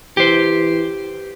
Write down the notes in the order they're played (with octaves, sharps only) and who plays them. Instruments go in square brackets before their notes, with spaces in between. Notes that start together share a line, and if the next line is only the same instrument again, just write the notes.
[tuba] E3 [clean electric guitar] G4 C5